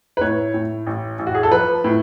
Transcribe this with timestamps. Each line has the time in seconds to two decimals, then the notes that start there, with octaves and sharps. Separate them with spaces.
0.17 B4
0.21 A2 C#5
0.54 A2
0.87 A1
1.19 A1
1.27 F#4
1.35 G#4
1.43 A4
1.52 F3 B4
1.84 A2